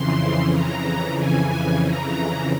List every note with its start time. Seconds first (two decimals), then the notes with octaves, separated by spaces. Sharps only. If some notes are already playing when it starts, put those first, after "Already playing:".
Already playing: F2 C#3 E3 C6
0.52 A#5
1.18 G#5
1.85 A#5